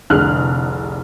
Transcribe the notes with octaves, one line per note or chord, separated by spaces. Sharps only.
F1 C2 D3 G#4 F6 F#6